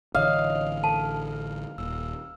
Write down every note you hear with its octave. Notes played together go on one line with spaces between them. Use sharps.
A1 D3 E3 C#5 D#5 F5 D#6
A4 A5
D#1 E6